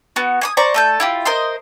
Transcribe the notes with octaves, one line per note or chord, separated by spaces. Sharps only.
B3 F#4
G#5 C#6 D#6
C5 D5 A#5 C#6
A3 A4 G6
E4 F4 G4
A#4 C5 D#5 C6